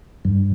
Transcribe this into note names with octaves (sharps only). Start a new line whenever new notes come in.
G2